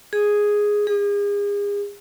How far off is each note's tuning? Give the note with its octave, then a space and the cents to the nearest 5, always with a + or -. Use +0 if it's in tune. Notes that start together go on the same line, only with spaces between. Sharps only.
G#4 +0
G#4 -35